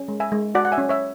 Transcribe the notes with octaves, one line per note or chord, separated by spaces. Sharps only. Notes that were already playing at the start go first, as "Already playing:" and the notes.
Already playing: C#4
G#3
E5 G#5
G#3
F#4 D5 F#5
F#5
E5 G#5
C#4
C#5 E5